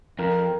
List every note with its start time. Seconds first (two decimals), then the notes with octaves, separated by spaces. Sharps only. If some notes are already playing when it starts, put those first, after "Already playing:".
0.19 F2 A#4